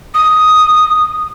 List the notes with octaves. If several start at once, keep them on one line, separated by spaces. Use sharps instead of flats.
D#6